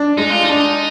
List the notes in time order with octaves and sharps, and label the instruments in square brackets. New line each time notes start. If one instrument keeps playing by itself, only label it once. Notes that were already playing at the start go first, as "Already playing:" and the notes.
Already playing: [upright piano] D4
[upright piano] G#3 [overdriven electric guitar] D#4
[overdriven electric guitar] F4
D#4
[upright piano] D4